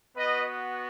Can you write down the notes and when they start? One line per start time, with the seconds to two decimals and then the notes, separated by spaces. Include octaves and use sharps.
0.16 B3 F#4 B4 D#5